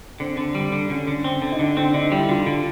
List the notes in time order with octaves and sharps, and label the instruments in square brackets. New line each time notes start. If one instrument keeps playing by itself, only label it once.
[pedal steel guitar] D3 [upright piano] C4
[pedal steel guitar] D3
G3
D3
[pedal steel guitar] D3 [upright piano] C#4
[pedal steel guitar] D3
C4
D3
[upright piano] D#4
[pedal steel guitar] D3 [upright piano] D4
[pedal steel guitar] C4 [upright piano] D4
[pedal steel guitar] D3 [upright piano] D#4
[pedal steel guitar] G3 [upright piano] E4
[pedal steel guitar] D3 [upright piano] F4
[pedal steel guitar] D3